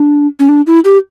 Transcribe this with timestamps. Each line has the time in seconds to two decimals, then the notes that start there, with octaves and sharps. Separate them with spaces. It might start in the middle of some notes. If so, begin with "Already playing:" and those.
Already playing: D4
0.40 C#4
0.49 D4
0.67 E4
0.85 G4